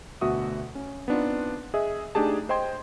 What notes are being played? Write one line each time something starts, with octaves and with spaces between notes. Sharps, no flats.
D2 B2 F#4 E5 D#6
C#4
B3 C4 D4 D#4 F4
G#4 D#5 E5
A3 D4 D#4 G4 G#4 A5
C5 D#5 G5 C6 G#6